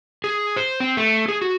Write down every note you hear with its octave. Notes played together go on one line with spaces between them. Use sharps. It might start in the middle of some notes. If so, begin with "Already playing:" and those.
G#4
C5
C4
A3
G#4
F#4